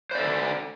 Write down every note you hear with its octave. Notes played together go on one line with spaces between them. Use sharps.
D4 A4 C5 D5